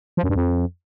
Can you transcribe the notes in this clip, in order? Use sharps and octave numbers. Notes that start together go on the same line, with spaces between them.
F3
F#2
G2
F2